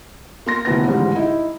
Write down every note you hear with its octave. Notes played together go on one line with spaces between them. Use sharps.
A#3 C6 A#6
F1 D2 B3 E4 B4 A#6
A1 D2 G#2 C#3 G3
D#4 E4